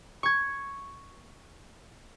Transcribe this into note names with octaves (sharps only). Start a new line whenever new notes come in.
C#6 G#6